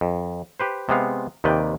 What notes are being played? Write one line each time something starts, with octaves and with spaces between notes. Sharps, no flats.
F2
G4 B4 C5
C3 G#3 B3 F5
D#2 C3 D#3 B4 D5 G5